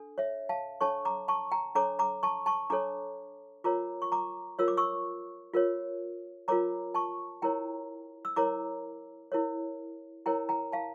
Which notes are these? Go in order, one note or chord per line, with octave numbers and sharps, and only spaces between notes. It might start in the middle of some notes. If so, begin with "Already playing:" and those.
Already playing: D4 A4
C#5 E5
F5 A5
D4 A4 C#5 A5 C#6
A#5 D6
A5 C#6
G5 A#5
D4 A4 C#5 A#5 D6
A#5 D6
A5 C#6
A5 C#6
D4 A4 C#5 A#5 D6
F4 A#4 C#5 A#5 D6
C#6
A#5 D6
F4 A#4 C#5 E6
D6
C#6 E6
F4 A#4 C#5
F4 A#4 C#5 A#5 D6
A5 C#6
E4 A#4 C#5 G5 A#5
E6
E4 A#4 C#5 A#5 D6
E4 A#4 C#5
E4 A#4 C#5 G5 A#5
G5 A#5
F5 A5